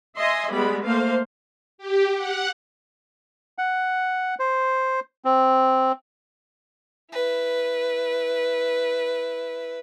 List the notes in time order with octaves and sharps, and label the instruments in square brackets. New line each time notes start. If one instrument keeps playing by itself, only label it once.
[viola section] D#5 E5 G#5 C6
G3 G#3 B3 B5
A3 A#3 C5 F5
[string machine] G4
F#5
[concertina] F#5
C5
C4
[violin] E4 B4